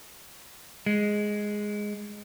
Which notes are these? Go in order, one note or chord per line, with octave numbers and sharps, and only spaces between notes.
G#3